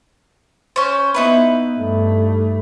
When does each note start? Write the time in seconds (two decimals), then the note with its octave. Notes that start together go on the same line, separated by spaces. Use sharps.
0.76 C#4 C5
1.14 B3 D#4 E4 B4
1.77 G2 A3